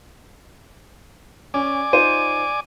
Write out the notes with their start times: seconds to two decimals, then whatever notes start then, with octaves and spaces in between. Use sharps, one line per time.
1.54 C#4 D5 G#5 D6
1.93 D#4 F4 C5 D#7